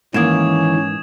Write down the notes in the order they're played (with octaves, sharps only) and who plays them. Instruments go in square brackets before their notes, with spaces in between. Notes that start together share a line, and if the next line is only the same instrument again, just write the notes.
[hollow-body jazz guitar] G#2 A#3 [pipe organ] D#3 E3 [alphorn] C#4 [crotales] D#6 G#6 E7